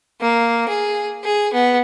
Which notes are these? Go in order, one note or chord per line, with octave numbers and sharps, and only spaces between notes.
A#3
G#4
G#4
B3